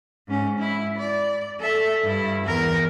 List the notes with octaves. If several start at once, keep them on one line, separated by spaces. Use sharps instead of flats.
G#2 C#4
E4
D5
A4 E5
G2 E4
E2 A#4